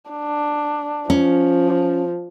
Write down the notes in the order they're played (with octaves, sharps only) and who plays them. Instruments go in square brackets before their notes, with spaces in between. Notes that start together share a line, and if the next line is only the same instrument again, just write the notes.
[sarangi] D4
[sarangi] F3 [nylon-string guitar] C#4